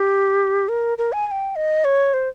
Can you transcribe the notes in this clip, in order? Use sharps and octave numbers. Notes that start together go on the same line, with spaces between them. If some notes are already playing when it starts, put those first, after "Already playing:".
Already playing: G4
A#4
A#4
G#5
G#5
G5
D#5
C#5
C5